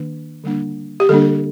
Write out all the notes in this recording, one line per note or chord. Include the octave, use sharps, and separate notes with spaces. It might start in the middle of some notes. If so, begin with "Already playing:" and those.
Already playing: D#3 A#3 D4
D3 G3 A#3 D4
G4
D3 G3 A#3 D4 A4